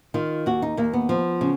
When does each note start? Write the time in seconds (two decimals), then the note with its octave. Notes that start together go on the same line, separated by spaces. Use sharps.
0.14 D#3 F4
0.46 D#2 F#4
0.62 D#4
0.77 D#2 A#3
0.93 B3
1.09 F3
1.41 C#3